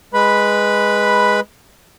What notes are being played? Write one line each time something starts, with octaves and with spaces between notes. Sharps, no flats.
G#3 B4 B5